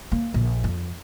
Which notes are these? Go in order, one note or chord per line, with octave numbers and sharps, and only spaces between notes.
A#3
A#1
F2